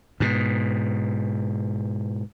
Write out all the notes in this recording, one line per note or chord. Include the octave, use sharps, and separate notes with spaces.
G#2 B2